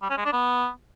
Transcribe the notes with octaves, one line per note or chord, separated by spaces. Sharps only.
G3
C#4
G#3
D4
B3